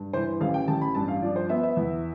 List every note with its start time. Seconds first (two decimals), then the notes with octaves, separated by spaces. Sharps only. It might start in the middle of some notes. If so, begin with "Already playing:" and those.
Already playing: G2
0.13 E3 C5
0.41 A1 F5
0.54 G5
0.68 A1 A5
0.81 B5
0.95 G2 A5
1.08 F5
1.22 F3 D5
1.36 C5
1.49 B3 E5
1.63 E5
1.77 E2